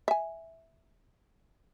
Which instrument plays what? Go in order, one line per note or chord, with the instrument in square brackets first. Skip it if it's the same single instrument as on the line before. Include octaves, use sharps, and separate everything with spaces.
[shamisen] E5 G#5